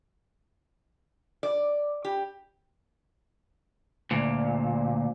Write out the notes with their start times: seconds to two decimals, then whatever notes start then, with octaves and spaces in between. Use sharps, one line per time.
1.43 D5
2.05 G4
4.11 D2 A#2